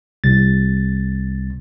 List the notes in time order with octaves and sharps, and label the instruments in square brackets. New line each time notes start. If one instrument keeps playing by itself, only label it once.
[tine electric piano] C2 A6